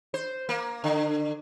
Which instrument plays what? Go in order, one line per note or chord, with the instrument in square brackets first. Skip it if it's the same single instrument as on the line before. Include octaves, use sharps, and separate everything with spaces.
[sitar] C5
A#3
D3